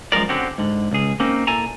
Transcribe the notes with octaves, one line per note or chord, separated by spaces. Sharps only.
F#2 F3 G#3 A#4 D5
D3 C4 C#4 F#4 G4
G#2 D3
C#2 G#4
A#3 C4 C#4 D#4
A#2 E4 A4 G#5 A#5